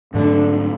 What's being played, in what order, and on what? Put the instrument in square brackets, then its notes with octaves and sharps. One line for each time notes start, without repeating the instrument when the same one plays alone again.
[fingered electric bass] G#2 F#3 A3 [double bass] D3